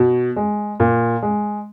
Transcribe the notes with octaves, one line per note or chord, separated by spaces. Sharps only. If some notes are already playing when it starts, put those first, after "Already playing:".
Already playing: B2
G#3
A#2
G#3